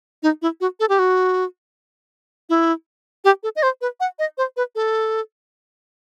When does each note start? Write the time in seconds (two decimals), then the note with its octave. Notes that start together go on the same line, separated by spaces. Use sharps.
0.23 D#4
0.42 E4
0.61 F#4
0.80 A4
0.89 G4
0.99 F#4
2.49 E4
3.25 G4
3.43 A4
3.56 D#5
3.63 C5
3.81 B4
4.00 F#5
4.19 D#5
4.38 C5
4.57 B4
4.75 A4